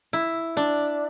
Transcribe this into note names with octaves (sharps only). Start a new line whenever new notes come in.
E4
D4